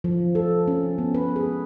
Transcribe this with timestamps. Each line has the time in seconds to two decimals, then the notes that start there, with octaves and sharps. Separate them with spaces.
0.04 F3
0.35 A4
0.68 C#4
0.98 B3
1.15 B4
1.36 G#4